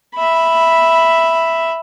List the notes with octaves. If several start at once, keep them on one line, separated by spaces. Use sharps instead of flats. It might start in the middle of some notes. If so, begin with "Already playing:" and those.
E5 B5